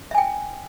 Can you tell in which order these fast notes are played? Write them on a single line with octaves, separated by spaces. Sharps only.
E5 G#5 G5